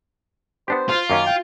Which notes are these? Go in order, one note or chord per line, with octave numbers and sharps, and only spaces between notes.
B3 D4 G4 C5
F4
F#2 D#3 A#3 C#4
G5